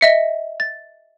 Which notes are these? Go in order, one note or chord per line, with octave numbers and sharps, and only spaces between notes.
D#5 E5 C#7
A6